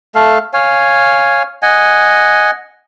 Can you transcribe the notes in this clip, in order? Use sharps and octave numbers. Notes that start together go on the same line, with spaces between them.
A3 A4 F5
C#5 F5 G#5
D#5 F#5 G#5